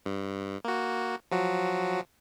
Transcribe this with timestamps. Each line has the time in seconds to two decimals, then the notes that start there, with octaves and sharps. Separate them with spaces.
0.06 G2
0.65 A#3 F#4
1.31 F3 F#3 F#4